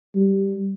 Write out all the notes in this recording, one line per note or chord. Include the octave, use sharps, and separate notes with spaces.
G3